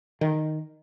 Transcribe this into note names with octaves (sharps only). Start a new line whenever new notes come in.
D#3